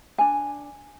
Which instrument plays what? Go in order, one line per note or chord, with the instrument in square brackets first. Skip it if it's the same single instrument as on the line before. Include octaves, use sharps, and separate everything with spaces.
[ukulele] D4 G#5